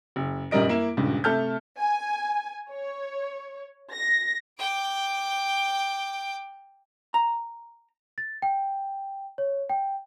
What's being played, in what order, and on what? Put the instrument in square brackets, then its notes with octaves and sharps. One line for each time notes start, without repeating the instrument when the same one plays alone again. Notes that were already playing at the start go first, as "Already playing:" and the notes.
[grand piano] F#1
D#1 F#2 G3 A#4 D#5 D7
A#3 E4 E7
D#1 C#2 G2
C3 A3 A4 A5 F6 G6
[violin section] G#5
C#5
A#6
[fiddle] G5 D6
[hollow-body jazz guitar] A#5
[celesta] A6
G5
C#5
G5